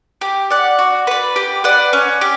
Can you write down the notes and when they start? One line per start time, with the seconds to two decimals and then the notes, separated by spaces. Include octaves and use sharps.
0.21 G4
0.50 D5 F#5
0.79 F#4
1.07 B4 D5
1.36 G4
1.64 B4 D5 F#5
1.93 C#4
2.21 G4